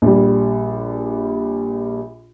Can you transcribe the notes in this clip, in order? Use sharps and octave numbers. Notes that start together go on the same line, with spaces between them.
A#1 G3